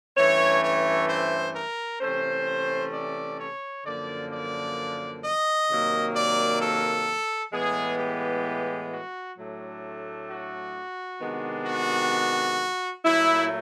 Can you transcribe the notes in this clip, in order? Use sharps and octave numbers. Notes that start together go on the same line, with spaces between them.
G2 E3 A3 C#4 C#5
C#5
C5
A#4
C3 E3 A3 C#4 C5
D5
C#5
F#2 D3 F3 A#3 D5
D5
D#5
C3 D#3 F#3 A#3
D5
A4
A2 E3 G#3 B3 G#4
G4
F#4
A2 F#3 A3 D4
F#4
C3 D#3 G#3 B3 D4
F#4
A#2 F#3 A3 E4